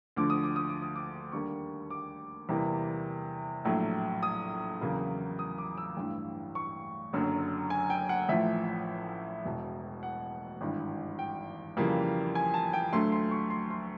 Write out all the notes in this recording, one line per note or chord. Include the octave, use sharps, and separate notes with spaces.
D2 D3 F3 D6
D#6
D6
D#6
D6
D#6
D6
D#2 D3 G3 A#3 C#6
D6
E2 C3 E3 G3 A#3
A#1 A2 F#3 A3
D#6
E2 C#3 F#3 A#3
D#6
D6
E6
A1 G2 E3
C#6
F#1 F#2 D3 F#3
G#5
G5
F#5
A1 A2 F3 E5
E1 E2 B2
F#5
G#1 G2 E3
G5
F2 C#3 E3 G3 A#3
G#5
A5
G5
D2 D3 F#3 A3 C6
C6
C#6
C6
C6